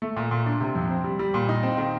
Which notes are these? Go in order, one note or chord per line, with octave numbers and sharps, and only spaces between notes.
A3
A#2
A#2
D4
C3
F2
C4
G3
G3
A#2
D#4
C4
D#3